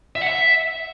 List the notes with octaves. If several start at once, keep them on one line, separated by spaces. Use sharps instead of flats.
E5
F#5
E5